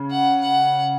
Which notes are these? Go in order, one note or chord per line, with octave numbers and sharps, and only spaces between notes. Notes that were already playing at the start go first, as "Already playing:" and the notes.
Already playing: C#3
F#5
F#5